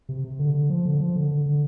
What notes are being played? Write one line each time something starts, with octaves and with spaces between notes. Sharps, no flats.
C3
C3
D3
D3
F3
D3
F3
D3
D3
D3